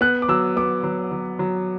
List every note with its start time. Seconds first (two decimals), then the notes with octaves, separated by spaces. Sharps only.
0.01 B3 F#6
0.22 D6
0.28 F#3 E6
0.57 B3 D6
0.84 F#3
1.12 F#3
1.39 F#3